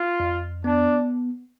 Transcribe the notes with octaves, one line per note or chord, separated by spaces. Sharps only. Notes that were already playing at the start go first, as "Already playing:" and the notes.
Already playing: F4
F2
B3 D4